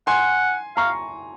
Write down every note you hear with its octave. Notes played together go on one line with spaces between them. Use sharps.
F#5 G#5 C6
F5 A#5 C#6